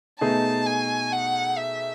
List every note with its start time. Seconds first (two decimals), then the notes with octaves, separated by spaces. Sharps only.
0.20 B2 A3 D#4 G#4 A5
0.66 G#5
1.12 F#5
1.58 E5